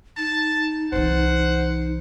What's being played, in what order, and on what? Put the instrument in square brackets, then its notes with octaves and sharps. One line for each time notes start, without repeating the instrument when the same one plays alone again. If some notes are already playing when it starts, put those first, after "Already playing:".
[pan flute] D#4 [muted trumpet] A5
[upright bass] C2 E3 [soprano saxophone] C5 [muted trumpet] F#5